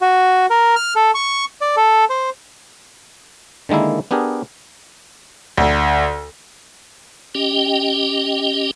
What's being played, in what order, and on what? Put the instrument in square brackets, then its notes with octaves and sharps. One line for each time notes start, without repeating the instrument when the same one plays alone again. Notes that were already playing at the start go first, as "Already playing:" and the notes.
[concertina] F#4
A#4
F6
A4
C#6
D5
A4
C5
[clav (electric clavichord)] D3 D#3 G#3 A#3 E4
B3 D4 G4 G#4 A#4
[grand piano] D2
[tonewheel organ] C#4 G4 D#5 G5